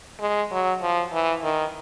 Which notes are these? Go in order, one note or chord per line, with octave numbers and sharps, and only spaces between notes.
G#3
F#3
F3
E3
D#3